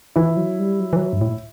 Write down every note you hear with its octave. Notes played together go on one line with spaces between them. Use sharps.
E3 E4
F#3
G3
F#3
E3
F#3
G2
A2